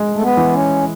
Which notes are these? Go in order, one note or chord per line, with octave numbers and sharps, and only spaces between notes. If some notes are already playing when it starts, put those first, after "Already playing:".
Already playing: G#3
A3
B3
E3
C#4